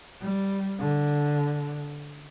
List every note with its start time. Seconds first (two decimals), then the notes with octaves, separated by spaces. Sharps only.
0.21 G3
0.79 D3